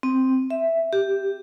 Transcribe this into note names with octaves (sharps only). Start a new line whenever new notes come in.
C4
E5
G4